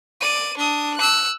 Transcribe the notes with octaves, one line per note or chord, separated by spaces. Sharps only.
D5 D#7
D4 D#6
E6 F#6